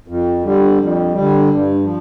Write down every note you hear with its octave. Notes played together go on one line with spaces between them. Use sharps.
F2
D3 G3
F2
D3 G3
G2
F3